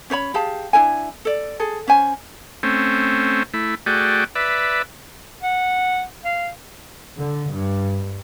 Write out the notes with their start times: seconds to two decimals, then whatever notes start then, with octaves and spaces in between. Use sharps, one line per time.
0.10 C#4 C5 C#5 B5
0.34 G4 G#4 F5 A5
0.73 D4 E4 A#4 G#5
1.25 A4 D5
1.60 G#4 A4
1.87 C#4 C5 G#5
2.63 A3 C4 C#4
3.54 A3 E4
3.86 A3 F#4 G#4 D5 G5
4.35 B4 D5 E5
5.43 F#5
6.25 F5
7.20 D3
7.52 G2